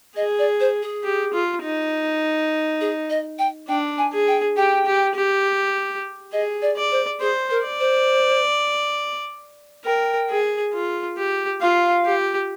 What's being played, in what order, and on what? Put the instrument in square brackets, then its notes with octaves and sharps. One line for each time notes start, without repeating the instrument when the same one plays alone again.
[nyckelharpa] G#4 [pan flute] D#5
[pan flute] D5
C5
G#4
[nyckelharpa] G4
F4
D#4
[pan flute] G#4
D#5
G5
[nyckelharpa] D4 [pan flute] G5
[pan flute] G#5
[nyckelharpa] G#4
[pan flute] G5
[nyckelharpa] G4 [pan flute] G5
[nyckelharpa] G4
G4
[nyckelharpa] G#4 [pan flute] D#5
[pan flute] D5
[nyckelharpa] D5
[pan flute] C5
[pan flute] G#4 [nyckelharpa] C5
[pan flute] A#4
[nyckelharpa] D5
[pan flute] C5
[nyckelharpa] A#4 [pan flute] G5
[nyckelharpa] G#4
F4
G4
[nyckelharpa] F4 [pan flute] F5
[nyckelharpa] G4